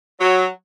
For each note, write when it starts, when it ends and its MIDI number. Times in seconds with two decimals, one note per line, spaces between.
0.20 0.46 54